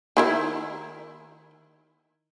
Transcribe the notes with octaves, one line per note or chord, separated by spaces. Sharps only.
D#3 E4 A#4